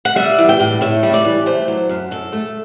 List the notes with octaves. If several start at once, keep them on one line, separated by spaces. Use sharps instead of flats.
F#5
G3 E5
E3
G5
A2
A2 E5
G3
D5
E3
A3 C5
F#3
F#2
F#2 A4
A3